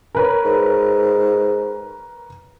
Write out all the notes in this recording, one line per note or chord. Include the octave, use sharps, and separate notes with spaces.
A#4 B4 C#5
G#2